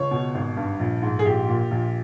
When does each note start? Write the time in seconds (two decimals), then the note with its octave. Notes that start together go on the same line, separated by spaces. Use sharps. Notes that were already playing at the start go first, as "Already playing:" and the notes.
Already playing: C#2 C#5
0.11 B2
0.34 G#1
0.57 G2
0.80 A#1
1.02 G#2
1.19 G#4
1.25 A#1 G4
1.49 A#2
1.71 A#1